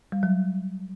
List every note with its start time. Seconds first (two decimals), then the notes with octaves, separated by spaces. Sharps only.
0.12 G3
0.23 F#3